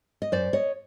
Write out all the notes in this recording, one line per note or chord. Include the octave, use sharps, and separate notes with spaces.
D#5
F#2 C5 D5
C#5 D#5